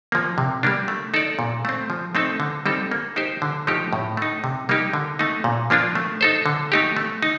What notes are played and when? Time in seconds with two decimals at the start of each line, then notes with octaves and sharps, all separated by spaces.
0.12 F3 A#3
0.38 C3
0.63 G3 A#3 D4
0.88 A3
1.14 D#4 A4 D5
1.39 A#2
1.65 A3 C4
1.90 F3
2.15 A3 C4 D#4 A4
2.40 D3
2.66 G3 C4 D#4 A4
2.92 A#3
3.16 D#4 G4 C5
3.42 D3
3.67 F3 A3 D#4 G4
3.93 A2
4.17 A3 D#4
4.44 C3
4.69 G3 A#3 D#4 G4
4.93 D3
5.19 A3 D#4
5.44 A#2
5.70 F3 A#3 D4 F4
5.95 A3
6.21 D#4 A4 C5
6.46 D3
6.72 A3 D#4 G4
6.97 A3
7.23 D#4